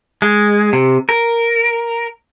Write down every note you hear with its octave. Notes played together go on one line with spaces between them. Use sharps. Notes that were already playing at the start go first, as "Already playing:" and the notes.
G#3
C3
A#4